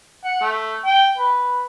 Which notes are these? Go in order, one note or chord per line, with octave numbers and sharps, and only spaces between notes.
F#5
A3
G5
B4